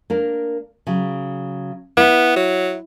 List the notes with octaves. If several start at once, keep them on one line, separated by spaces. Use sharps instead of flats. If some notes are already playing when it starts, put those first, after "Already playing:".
A#3 D4 A#4
C#3 F#3
B3 E4
F#3